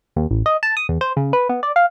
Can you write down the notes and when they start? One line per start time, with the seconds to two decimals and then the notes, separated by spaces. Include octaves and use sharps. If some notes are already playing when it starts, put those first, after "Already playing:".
0.16 D#2
0.31 A1
0.46 D#5
0.63 A5
0.77 D#6
0.89 E2
1.01 C5
1.17 C#3
1.33 B4
1.49 B3
1.63 D5
1.76 F5